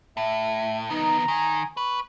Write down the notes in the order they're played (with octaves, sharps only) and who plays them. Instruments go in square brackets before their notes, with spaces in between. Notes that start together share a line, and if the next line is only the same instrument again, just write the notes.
[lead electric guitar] A2 [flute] E5
[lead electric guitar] D#3 B3 [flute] D#4 [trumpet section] A#5
[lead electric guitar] D#3 [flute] G#5
[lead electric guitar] B4 [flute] C#6